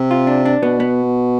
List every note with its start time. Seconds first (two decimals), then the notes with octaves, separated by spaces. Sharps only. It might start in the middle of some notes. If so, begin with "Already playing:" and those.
Already playing: C3
0.11 F4
0.27 D4
0.45 D4
0.62 B2 B3
0.80 B3